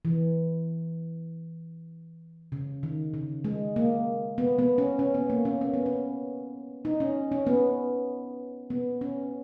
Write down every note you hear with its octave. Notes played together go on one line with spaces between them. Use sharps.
E3
C#3
D#3
C#3
G#3
A#3
B3
B3
C#4
C#4
B3
A#3
C#4
C#4
B3
C#4
D#4
C#4
C#4
B3
B3
C#4